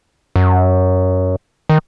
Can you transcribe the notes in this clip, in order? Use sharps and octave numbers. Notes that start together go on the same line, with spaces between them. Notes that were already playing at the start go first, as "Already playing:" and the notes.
F#2
D#3